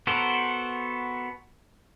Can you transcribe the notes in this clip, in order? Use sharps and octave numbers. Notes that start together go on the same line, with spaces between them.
B3 F#4 A4 A#4 C5